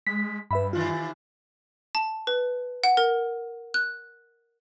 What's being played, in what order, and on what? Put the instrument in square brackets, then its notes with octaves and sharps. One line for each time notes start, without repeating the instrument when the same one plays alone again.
[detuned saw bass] G#3 [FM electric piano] B6
[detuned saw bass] G2 [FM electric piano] B4 E5 B5
[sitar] C3 D#3 E3 [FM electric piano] F4
[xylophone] A5
B4
F#5
A#4
F#6